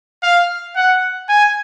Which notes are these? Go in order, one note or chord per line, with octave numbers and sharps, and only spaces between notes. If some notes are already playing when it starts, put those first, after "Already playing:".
F5
F#5
G#5